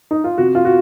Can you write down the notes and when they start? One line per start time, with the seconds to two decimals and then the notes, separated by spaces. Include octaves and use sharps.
0.11 D#4
0.24 F4
0.38 C3 F#4
0.55 F4
0.65 F#4